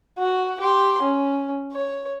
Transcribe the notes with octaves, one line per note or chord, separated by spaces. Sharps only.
F#4
G4 C6
C#4
C#5